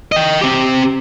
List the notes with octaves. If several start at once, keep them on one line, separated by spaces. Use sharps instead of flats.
D#5 G5
C4 G4